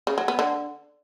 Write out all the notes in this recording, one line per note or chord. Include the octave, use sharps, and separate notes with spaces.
C#3
F#3
B3
D3